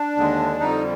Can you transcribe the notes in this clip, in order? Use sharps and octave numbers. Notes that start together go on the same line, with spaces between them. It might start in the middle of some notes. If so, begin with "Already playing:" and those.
Already playing: D4
D#2 D3 G#3
F2 D3 G3 D#4